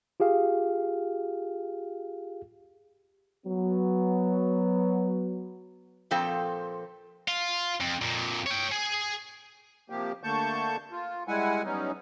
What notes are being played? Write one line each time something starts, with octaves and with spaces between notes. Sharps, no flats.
F4 G4 G#4 F5
F#3 B3
A#2 F3 C4 A4 G5
F4
F2
F2 A#2
C#5 G5
G#4
C3 F3 A#3 G4
D3 A3 A#3 A5 C#6 G6
F4
G3 G#3 E4 F#5 G#5
F#3 G3 B3 C#4 D#4